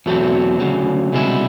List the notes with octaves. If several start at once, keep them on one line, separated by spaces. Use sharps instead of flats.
E2 B2 F#3 A3 C4
D2 C#3 F#3
C2 B2 G#3 C#4 E4